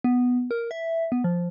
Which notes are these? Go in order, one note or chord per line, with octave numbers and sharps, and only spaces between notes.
B3
A#4
E5
B3
F3